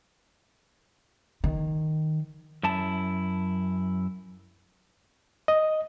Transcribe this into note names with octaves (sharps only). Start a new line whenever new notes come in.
D#3
F#2 E4 A5
D#5